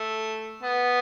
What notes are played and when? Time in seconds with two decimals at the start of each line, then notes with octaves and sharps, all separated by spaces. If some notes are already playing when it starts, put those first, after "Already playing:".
Already playing: A3
0.63 B3